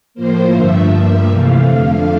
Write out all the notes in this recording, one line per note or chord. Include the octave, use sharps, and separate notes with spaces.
A2 F3 A#3 C5
G2 D3 F3 A3 E5
G2 F3 A#3
C3 E3 A3 F5
F2 D3 A3